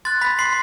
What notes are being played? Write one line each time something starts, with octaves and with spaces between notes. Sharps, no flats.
C6 F#6 A6
B5 B6
C6 C7